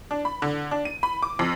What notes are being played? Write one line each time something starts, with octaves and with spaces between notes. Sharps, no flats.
D4
B5
D3
D4
D#7
B5
D6
F2